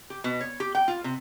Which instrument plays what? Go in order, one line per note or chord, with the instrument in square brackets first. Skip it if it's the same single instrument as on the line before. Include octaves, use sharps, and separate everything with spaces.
[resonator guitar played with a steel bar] G4
B2
C#5
G4
G5
F4
C3